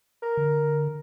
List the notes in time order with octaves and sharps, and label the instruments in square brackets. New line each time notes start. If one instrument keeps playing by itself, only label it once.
[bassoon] A#4
[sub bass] D3